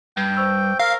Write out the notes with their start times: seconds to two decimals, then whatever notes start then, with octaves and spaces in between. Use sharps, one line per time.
0.17 G2 G5
0.37 C5 C#6 E6
0.80 A#4 F5